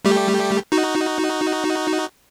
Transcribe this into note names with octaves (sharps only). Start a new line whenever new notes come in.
G3 A3 G4
D#4 F#4